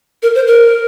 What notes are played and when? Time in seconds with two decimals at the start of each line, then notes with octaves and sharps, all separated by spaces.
0.23 A#4
0.35 C5
0.47 A#4